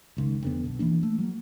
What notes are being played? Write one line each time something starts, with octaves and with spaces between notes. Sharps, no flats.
F#1 C#2 D#3
F1 D3 B3
B1
E3 F#3 A#3 D4
A3
F#3 A#3